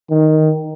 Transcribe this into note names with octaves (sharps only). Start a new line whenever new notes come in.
D#3